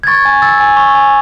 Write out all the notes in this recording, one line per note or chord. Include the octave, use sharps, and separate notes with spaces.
G#6
C#6 A6
G#5
E6 A6
G#5
C#6
G#5